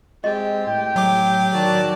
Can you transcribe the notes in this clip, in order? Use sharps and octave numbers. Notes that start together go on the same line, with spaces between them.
G#3 C4 G4 D#5
A2 G5
F#3 D6
D#3 F#4 D5 A5